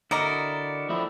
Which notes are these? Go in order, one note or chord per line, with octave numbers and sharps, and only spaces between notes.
D3 E4 F#4 A#4 D5 D#5 A#5
F3 A3 E4